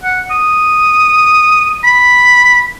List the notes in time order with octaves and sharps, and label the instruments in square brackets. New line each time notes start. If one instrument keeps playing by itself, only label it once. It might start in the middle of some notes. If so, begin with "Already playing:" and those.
[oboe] F#5
D#6
B5